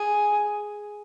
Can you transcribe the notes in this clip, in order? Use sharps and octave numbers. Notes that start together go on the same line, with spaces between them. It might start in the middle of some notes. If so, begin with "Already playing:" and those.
Already playing: G#4